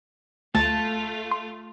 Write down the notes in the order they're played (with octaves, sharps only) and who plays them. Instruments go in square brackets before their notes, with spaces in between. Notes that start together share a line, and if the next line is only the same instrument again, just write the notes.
[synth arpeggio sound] D2 [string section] A3 F4 [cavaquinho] A5
[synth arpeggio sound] C6